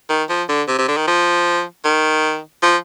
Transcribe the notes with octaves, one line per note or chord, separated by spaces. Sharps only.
D#3
F3
D3
C3
C3
D3
D#3
F3
D#3
F3